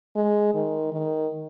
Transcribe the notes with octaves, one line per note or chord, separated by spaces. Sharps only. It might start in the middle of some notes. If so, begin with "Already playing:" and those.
G#3
D#3
D#3